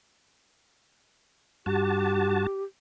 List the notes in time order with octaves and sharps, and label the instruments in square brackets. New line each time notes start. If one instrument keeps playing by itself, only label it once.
[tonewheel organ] G2 F#4 A5 [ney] G4